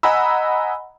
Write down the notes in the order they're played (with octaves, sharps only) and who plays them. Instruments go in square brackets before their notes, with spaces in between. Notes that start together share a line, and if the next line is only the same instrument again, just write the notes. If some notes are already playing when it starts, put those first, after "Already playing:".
[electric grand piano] D#5 F#5 G#5 A#5 B5 E6